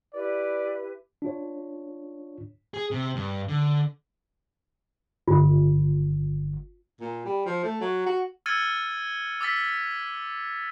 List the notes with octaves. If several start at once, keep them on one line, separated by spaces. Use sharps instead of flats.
E4 G4 B4 D5
D4 F4 C#5
G#4
C3
G2
D3
G1 F4
A#2
G3
F3
A3
F#3
F#4
E6 F6 G#6 A6 C#7 D#7
D6 E6 A6 B6